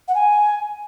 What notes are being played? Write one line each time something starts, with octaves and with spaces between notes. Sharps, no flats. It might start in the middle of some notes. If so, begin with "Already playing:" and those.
F#5
G#5